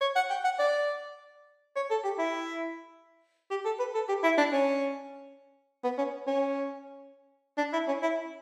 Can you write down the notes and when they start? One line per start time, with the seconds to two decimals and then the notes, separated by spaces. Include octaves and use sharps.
0.01 C#5
0.16 F#5
0.30 G5
0.44 F#5
0.59 D5
1.76 C#5
1.91 A4
2.04 G4
2.19 E4
3.50 G4
3.65 A4
3.79 B4
3.94 A4
4.09 G4
4.24 E4
4.38 D4
4.53 C#4
5.84 B3
5.98 C#4
6.27 C#4
7.58 D4
7.73 E4
7.88 C#4
8.02 E4